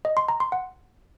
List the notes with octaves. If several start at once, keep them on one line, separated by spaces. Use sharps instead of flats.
D#5
C6
A#5
C6
F#5